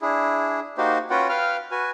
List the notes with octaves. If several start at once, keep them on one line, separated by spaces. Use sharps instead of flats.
D4 E4 G#4
A#3 D#4 F#4 G4 C5
C#4 F4 F#4 B4 F#5 G5
B4 F5 G5 F6
F#4 B4 G#5